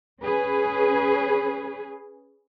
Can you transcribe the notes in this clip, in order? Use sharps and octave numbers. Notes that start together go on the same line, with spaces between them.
C#4 G#4 B4